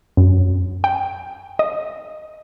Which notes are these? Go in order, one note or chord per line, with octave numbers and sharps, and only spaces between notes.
F#2
G5
D#5